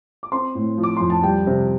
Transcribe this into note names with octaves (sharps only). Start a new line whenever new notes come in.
D6
C4 C6
A2
F3
D6
F2 C6
A5
G3 G5
C3